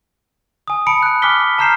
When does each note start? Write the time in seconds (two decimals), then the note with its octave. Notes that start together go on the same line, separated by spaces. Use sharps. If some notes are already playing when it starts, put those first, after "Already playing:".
0.68 G#5 D#6
0.87 A5 B5 C#7 D7
1.03 F#6
1.22 G#5 D6 F6 F#6 B6 G7
1.58 A5 A#5 F6 G6 C7 E7